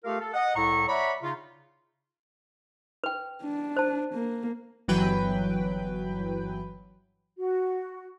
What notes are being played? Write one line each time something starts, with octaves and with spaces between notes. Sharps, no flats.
A3 F4 G4 A4 A#4 F5
A4
D#5 F#5
C2 A2 E4 A4 A#5 C#6
C#5 D5 E5 F#5 A#5 B5
C#3 D#4 F4
B4 G5
D4
C5 A5
A#3
G1 E3 F#3 B4 G5
F#4